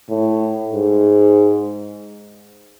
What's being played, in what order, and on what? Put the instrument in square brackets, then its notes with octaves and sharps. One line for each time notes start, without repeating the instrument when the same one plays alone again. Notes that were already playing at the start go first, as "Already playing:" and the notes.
[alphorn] A2
G#2